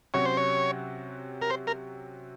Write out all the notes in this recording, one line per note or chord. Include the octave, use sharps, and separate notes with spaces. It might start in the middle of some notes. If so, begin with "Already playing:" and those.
C3 F#3 C#4 F#4 C#5
C5
C#5
A#4
C5
A#4